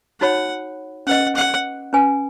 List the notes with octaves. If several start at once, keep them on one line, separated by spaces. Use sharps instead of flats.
D#4 F#4 C#5 F#5 B5
C#4 B4 D#5 F#5
F#5
C#4 B4 G#5